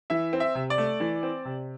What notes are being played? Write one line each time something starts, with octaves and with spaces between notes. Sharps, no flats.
E3 E5
C4
E5
C3
D5
A3
E3
C4
C3